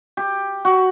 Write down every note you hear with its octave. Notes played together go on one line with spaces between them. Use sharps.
G4
F#4